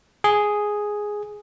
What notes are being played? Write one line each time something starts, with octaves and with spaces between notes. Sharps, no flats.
G#4